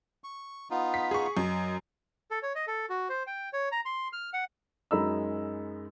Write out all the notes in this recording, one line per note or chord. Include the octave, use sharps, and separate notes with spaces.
C#6
B3 D#4 F4
B6
G#4 C#6
F#2 D#5
A4
C#5
D#5
A4
F#4
C5
G5
C#5
A#5
C6
F6
F#5
F#2 G#3 D#4 A#5 B5 E6